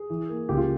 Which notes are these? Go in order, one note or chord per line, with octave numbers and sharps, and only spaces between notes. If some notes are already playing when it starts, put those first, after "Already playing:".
Already playing: G#4
E3
A#3
C#2 G4
F4